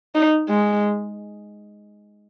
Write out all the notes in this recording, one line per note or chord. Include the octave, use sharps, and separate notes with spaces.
D#4
G#3